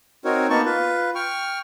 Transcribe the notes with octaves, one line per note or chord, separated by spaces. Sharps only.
C4 D#4 F#4 A#4 C#5
A#3 B3 D#4 A5 C#6
F4 B4
G5 C#6 F6